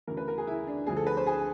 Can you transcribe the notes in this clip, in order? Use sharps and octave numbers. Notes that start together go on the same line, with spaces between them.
D2 C#3 E3 A#4
B4
A#4
G#4
E4
D4
D2 D3 F3 G#4
A4
B4
C5
G#4